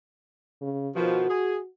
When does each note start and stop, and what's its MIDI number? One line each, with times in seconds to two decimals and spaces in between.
0.61 0.89 49
0.96 1.25 47
0.96 1.25 51
0.96 1.25 53
0.96 1.67 66
1.29 1.58 68